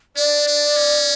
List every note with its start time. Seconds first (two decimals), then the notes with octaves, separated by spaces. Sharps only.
0.16 D4 D5
0.47 D4
0.77 C#4